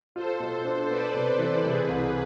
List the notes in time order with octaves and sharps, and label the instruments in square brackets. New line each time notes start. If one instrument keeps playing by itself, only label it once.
[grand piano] F4 [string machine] A4 C5
[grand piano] B2
D4
[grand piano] B3 [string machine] B4 D5
[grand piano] C3
[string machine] A4 C5
[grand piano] E3
[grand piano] C3 [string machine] G#4 B4
[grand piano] C2